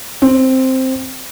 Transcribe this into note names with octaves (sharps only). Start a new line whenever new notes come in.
C4